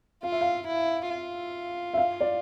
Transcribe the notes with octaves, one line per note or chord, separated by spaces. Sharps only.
F4 F5
E5
F5
E4
F4
E5
F5
D5